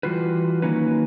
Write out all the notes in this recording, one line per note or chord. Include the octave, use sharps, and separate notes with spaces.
E3 G3 F4 F#4 B4
D#3 F#3 A#3 C#4 D#4 B4